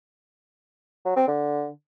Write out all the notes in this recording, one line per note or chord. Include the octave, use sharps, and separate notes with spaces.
F#3
C4
D3